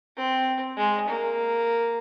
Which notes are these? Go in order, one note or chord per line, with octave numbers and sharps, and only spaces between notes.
C4
G#3
A#3